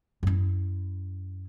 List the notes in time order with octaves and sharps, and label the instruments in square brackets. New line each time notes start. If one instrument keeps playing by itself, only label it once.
[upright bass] F#2 E4